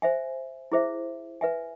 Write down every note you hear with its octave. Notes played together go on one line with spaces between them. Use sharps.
C5 E5 G#5
E4 G#4 C5 E5
B4 E5 G#5